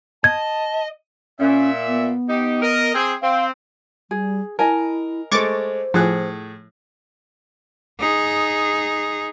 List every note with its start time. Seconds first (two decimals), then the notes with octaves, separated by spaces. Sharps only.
0.24 D#5 A5 G#6
1.40 A#2 C#4 E5
1.88 B3
2.28 D#4 G4
2.61 A#4 D#5
2.94 C4 G#4
3.22 C4 F5
4.11 G3 G#4
4.59 E4 A#4 D#5 G#5 A5
5.32 G#3 A3 C5 C#6 D6 A6
5.94 A2 F3 G#4 F#6
8.00 D#4 G#4